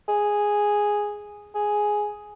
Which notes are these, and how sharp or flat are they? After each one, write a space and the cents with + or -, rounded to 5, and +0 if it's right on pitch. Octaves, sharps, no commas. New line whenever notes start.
G#4 -5
G#4 +5